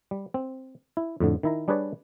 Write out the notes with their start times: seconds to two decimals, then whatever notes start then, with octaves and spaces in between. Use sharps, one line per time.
0.11 G3
0.34 C4
0.97 E4
1.20 F2 A2 D3
1.43 D#3 E4 A#5
1.68 G3 D4 G#4 B4 C#5 D5